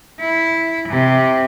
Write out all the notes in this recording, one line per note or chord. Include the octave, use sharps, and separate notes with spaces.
E4
C3